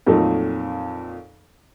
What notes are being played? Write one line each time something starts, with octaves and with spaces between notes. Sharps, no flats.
F2 A#2 F#3 A3 D#4